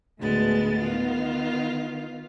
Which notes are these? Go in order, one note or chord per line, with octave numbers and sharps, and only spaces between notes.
D2 A2 G#3 B3 A6
D#3 B3 F4